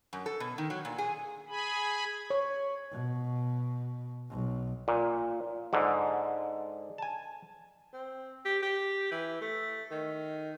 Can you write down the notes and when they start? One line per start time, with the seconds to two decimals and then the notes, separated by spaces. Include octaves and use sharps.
0.13 F#2
0.26 A4
0.40 B2
0.58 D#3
0.70 F#3
0.85 A#2
0.98 G#4
1.48 G#4 G#5 B5
2.30 C#5
2.91 B2
4.30 B1
4.88 A#2
5.73 G#2 D3
6.98 G#5 A5
7.93 C4
8.45 G4
8.62 G4
9.11 E3
9.41 A3
9.91 D#3